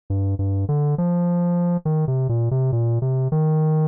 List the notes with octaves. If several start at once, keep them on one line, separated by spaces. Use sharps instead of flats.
G2
G2
D3
F3
D#3
C3
A#2
C3
A#2
C3
D#3